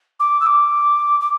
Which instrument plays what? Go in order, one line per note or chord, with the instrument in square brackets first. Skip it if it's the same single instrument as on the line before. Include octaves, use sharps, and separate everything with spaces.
[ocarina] D6
E6
D6
D6